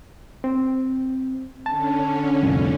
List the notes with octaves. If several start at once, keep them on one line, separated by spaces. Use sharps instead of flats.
C4
D3 C#4 A5
C2 F2 A2